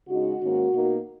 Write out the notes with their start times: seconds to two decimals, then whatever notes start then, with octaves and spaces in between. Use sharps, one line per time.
0.09 C#3 G#3 D#4 F#4
0.41 G#2 D#3 A#3 C#4
0.73 B2 A#3 D#4